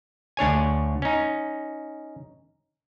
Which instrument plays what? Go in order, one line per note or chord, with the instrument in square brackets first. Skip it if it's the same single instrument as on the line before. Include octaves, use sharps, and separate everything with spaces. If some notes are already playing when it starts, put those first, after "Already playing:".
[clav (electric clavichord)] D2 D4 C#5 G#5
C#4 D#4